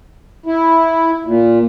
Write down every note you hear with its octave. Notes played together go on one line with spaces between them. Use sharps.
E4
A#2